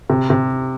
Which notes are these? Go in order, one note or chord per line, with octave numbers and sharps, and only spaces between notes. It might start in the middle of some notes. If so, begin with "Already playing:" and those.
C3
C3